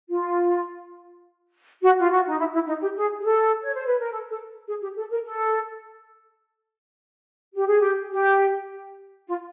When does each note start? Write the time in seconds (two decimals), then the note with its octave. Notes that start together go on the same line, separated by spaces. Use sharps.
0.10 F4
1.82 F#4
2.00 F4
2.11 F#4
2.28 D#4
2.39 E4
2.53 E4
2.67 D#4
2.82 G4
2.97 G#4
3.19 G#4
3.25 A4
3.63 C#5
3.75 C5
3.86 B4
3.99 A#4
4.12 A4
4.30 A4
4.68 G#4
4.82 G4
4.97 A4
5.11 A#4
5.25 A4
7.56 G4
7.68 G#4
7.81 G4
8.12 G4
9.28 F4